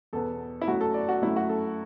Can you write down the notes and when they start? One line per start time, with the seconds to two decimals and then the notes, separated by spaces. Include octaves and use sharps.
0.13 E2 B2 B3 A4
0.61 E4
0.68 F#2 F#3 A3 F#4
0.81 A4
0.94 D5
1.09 F#4
1.22 F#2 F#3 A3 E4
1.36 F#4
1.49 A4